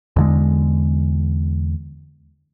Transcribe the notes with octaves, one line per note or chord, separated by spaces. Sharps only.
E2 D3 G#3